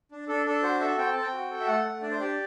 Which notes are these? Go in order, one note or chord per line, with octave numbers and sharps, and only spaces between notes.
D4
D4 A4
D4 A4
F#4 C5
A4 E5
C4 G5
C4 A5
G5
F#4
A4
E5
A3 F#5
A3
D4 D5
C5
G4 D5